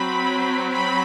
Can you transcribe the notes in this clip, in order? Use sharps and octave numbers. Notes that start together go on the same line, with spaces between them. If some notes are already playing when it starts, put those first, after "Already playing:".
Already playing: F#3 C4 B5
B5